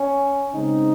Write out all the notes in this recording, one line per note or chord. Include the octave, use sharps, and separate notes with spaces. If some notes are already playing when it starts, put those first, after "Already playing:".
Already playing: C#4
C#3 G#3 C4 D#4